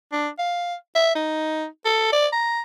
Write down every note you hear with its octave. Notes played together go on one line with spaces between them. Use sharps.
D4
F5
E5
D#4
A4
D5
A#5